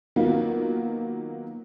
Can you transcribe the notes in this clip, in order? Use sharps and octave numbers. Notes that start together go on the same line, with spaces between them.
D#3 F#3 A#3 B3 F4 F#4